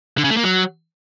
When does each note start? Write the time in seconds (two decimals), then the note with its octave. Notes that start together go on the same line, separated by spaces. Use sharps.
0.18 D3
0.24 C#3
0.30 A3
0.37 A#3
0.43 F#3